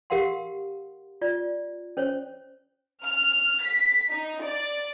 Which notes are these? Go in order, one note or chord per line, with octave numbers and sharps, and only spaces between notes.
G4 A#4 F5 F#5 C6
F4 D5
C#4 C5 C#5
F6
B6
D#4
D5